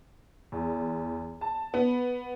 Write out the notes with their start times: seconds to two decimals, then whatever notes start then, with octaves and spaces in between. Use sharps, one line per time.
0.52 E2
1.41 A5
1.74 B3